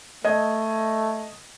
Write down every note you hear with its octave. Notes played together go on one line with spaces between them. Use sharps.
A3 D#5 G#6